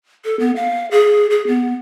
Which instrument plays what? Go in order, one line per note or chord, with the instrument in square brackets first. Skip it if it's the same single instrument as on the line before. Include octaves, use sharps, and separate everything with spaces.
[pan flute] A4
B3
F5
G#4
G#4
B3